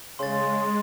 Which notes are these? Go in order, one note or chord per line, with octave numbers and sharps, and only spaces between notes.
C#3 G#3 C6 A6